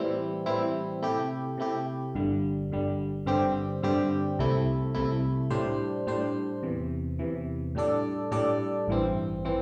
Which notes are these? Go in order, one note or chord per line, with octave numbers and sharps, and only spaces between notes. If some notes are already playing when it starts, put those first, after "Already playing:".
Already playing: A2 E3 G3 C4 E4
A2 E3 G3 C4 E4
C3 A3 E4 G4
C3 A3 E4 G4
G1 G2 D3 G3
G1 G2 D3 G3
G2 D3 G3 C4 G4
G2 D3 G3 C4 G4
C2 C3 A3 E4
C2 C3 A3 E4
A2 G3 D4 C5
A2 G3 D4 C5
E2 C3 E3
E2 C3 E3
A2 G3 D4 A4 D5
A2 G3 D4 A4 D5
A1 G2 E3 C4
E3 C4